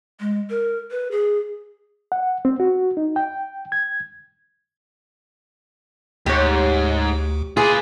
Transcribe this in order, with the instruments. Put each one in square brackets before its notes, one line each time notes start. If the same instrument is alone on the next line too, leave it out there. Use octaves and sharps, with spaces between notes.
[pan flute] G#3
A#4
B4
G#4
[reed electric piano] F#5
C4
F#4
D#4
G5
G#6
[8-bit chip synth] D2 [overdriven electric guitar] G#2 [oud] G4 C#5
[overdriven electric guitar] F4 B4 [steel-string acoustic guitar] G#4 [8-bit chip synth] C6 D6